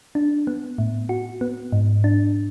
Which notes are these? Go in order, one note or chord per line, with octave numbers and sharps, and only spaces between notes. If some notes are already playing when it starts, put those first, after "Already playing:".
D4
B3
A2
F#4
B3
G#2
D4